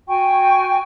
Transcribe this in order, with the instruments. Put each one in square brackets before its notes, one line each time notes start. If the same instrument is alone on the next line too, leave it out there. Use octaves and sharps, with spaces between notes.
[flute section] F#4 G5 G#5 C#6